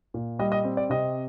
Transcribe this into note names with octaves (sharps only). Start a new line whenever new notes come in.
A#2
G3 D#5
D#5
C4
D5
C3 D#5